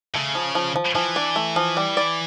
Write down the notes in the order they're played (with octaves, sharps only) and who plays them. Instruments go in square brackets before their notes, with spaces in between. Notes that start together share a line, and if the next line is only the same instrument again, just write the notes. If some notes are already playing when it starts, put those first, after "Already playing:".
[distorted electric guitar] C#3 [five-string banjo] A3
[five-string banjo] F3
F3
F3
[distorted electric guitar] E3 [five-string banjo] F3
[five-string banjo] D4
A3
F3
G3
D5